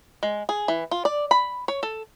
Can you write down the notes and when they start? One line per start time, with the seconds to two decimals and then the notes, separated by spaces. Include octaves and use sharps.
0.23 G#3
0.49 G#4
0.68 E3
0.91 F4
1.05 D5
1.31 B5
1.68 C#5
1.83 A4